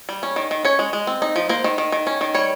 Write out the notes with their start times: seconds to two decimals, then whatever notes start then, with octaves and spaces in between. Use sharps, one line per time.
0.09 G3
0.23 C#4
0.36 D#3
0.51 D#3
0.65 C#4 C#5
0.79 G#3
0.93 G#3
1.07 C4
1.22 D#4
1.36 F3
1.49 A#3 C5
1.64 D#3
1.78 D#3
1.92 D#3
2.07 C#4
2.21 D#3
2.35 G3 C#5